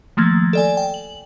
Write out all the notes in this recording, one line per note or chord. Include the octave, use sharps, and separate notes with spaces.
D#3 F3 A3 A#3 G#6
A4 D5 G#5
G5
F#7